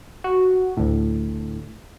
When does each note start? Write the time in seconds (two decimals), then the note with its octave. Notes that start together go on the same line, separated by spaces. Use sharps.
0.24 F#4
0.77 D2 A2